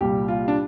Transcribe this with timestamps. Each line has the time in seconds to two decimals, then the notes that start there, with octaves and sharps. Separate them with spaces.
0.01 C2 A#2 G3 G4
0.28 F4
0.48 D4